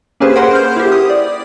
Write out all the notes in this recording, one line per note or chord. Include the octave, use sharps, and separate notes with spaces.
A#3 C#4 G4 G#4 B4 C5
A#4 F#5 C6
C5 F6 G6
E4 G4
D#6
D5